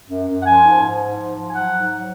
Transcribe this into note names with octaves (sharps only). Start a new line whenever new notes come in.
F#2
F#2
F#5
F3 G#5
G#2
G#2
F3
G#2
F3
G#5
F#3 F#5
G#2
F#3